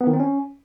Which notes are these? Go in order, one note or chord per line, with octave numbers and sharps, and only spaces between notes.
B3
D#3
C4
C#4